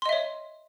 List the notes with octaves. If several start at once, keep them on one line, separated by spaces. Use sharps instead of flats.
C#5 D#5 E5 C6